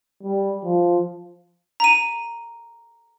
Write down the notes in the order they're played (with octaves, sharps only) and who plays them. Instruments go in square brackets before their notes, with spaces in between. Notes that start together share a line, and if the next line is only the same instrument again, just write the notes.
[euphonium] G3
F3
[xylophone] A#5 D#7